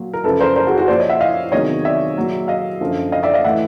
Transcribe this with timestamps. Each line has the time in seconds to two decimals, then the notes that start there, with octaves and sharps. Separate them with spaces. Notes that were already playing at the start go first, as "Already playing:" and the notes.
Already playing: A#2 F#3
0.13 A#4
0.24 F#2 C#3 F3 A4 B4
0.41 A#4 C5
0.56 A#4 C5
0.67 F#4 G#4
0.78 F#4 G#4
0.88 A#2 F3 C5 D5
0.99 C#5 D#5
1.10 E5 F#5
1.21 D#5 F5
1.52 E2 C3 D#3 F#3 C#5 D#5
1.85 D5 E5
2.17 A#2 F#3
2.48 D#5 F5
2.81 F#2 D3 F3
3.12 D#5 F5
3.23 D5 E5
3.34 D#5 F5
3.44 A2 E3 E5 F#5